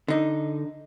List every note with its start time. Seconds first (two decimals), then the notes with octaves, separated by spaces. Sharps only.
0.08 D3 D#4